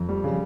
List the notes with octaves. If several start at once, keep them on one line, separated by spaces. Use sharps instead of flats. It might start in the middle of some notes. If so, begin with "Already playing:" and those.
Already playing: F2
G3
C#3